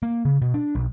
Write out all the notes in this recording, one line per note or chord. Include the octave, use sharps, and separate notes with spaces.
A#3
C#3
B2
D4
B1